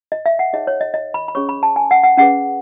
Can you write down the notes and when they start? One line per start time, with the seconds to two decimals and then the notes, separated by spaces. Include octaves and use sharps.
0.12 D#5
0.26 E5
0.39 F#5
0.53 D#4 G#4 C#5 D#5
0.67 C#5
0.81 D#5
0.94 D#5
1.14 B5
1.28 B5
1.35 C#4 G#4 C#5 C#6
1.49 B5
1.63 A5
1.76 G#5
1.91 F#5
2.04 F#5
2.17 C#4 G#4 B4 F#5